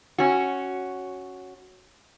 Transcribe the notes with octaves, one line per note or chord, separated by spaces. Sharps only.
C#4 F#4